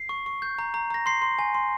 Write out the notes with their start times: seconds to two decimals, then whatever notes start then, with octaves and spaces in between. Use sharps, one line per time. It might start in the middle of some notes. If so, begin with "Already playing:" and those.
Already playing: C7
0.09 C#6
0.26 C#6
0.42 G6
0.59 A#5
0.74 A#5
0.90 A#5 A#6
1.06 C6 C7
1.22 C6
1.39 G#5
1.55 C6